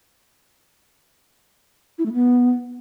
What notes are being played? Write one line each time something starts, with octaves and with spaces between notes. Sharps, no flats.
E4
A3
B3